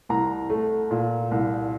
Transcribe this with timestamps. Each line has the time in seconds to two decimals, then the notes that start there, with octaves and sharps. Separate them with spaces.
0.09 C2 A#5
0.50 A3
0.91 A#2
1.31 C2